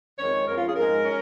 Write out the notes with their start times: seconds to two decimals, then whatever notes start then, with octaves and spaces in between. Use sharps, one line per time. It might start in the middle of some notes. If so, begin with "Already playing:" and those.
0.18 F2 D#3 G#3 C#5
0.47 F2 F3 C#4 A#4
0.57 F4
0.67 G#4
0.76 G#2 F3 G#3 A#4
1.05 C#4